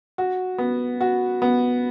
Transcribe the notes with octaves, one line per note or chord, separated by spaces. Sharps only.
F#4
B3
F#4
B3